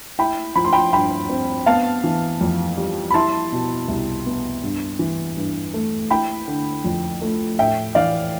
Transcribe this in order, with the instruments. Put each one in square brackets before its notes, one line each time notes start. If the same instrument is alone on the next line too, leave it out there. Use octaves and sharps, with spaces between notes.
[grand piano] E4 G5 B5
F3 B5
C6
G5 B5
G2 G5 B5
C4
B3 F5 A5
E3
F2
G3
B5
E4 A5 C6
B2
C2
B3
G2
E3
G2
A3
E4 G5 B5
D3
F2
A3
A2 E5 G5
E3 D5 F5